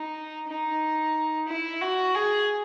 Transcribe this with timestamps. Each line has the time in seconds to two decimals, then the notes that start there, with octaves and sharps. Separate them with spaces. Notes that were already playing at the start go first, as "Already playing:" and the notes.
Already playing: D#4
0.48 D#4
1.48 E4
1.81 F#4
2.15 G#4